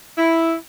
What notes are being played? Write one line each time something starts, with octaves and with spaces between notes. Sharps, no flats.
E4